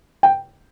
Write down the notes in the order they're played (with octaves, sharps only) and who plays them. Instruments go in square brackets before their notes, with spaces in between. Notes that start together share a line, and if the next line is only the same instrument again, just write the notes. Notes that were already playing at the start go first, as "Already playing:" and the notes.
[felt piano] G5